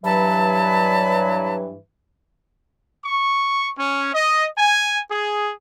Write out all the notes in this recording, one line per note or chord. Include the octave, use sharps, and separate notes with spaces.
G2 E3 F#3 A5 B5
C#6
C#4
D#5
G#5
G#4